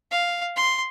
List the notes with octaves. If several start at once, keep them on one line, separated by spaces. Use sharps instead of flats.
F5
C6